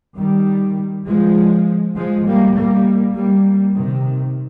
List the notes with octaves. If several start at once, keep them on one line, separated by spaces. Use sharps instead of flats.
D#3 G3
F3 G#3
F3 G#3
G3 A#3
G3 A#3
G3 A#3
C3 D#3